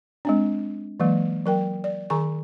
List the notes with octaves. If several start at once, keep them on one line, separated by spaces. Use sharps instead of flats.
G#3 C4 D4
E3 F#3 G#3 A#3
F#3 A#4 G5
D5
D#3 G#4 G#5 A#5 C#6